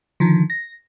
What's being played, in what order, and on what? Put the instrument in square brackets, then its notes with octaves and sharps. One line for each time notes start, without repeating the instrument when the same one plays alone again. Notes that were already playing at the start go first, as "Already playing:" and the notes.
[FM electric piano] D3 D#3 F3
A#6